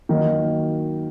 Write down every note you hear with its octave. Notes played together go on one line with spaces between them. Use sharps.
D#3 F#3 A#3 D#4 F#4